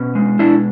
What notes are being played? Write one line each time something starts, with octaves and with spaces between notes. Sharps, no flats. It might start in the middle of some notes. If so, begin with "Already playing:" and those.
Already playing: B2 C#4
G#3
B2 D4 E4